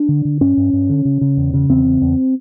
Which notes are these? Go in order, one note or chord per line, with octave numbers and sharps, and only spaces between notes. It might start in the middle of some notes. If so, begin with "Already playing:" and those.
Already playing: D4
D3
D3
G2 C#4
G2
G2
D3
C#3
C#3
E2
C#3
E2 C4
C#3
E2